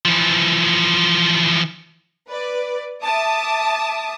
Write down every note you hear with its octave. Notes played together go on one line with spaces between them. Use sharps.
E3 F3
B4 D5
E5 A5 D6 D#6